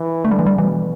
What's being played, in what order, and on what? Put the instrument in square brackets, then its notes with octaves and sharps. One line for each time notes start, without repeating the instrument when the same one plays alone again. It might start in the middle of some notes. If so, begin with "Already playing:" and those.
Already playing: [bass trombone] E3
[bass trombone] D3 [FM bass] A3
[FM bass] G3
E3
G3
[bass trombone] B2 [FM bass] E3